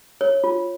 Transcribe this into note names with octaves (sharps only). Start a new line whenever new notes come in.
C#5
F4